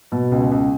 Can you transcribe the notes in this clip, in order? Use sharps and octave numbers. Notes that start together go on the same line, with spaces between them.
B2
C#2
C#2